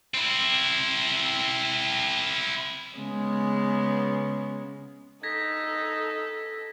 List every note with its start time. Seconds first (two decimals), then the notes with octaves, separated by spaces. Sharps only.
0.14 C4 E4
2.97 C#3 G#3 B3
5.23 D#4 A4 G#6 A#6 B6